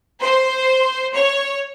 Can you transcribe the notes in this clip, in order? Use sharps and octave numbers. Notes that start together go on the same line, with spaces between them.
C5
C#5